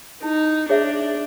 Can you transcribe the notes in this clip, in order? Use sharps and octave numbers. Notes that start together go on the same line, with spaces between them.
D#4 E4
D4 G#4 C#5 E5